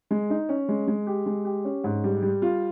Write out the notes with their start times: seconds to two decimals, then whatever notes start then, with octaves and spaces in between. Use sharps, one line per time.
0.11 G#3
0.30 D#4
0.49 C#4
0.69 G#3
0.87 G#3
1.07 G4
1.26 G#3
1.45 G4
1.65 C#4
1.84 G#2
2.04 G3
2.22 G3
2.42 F4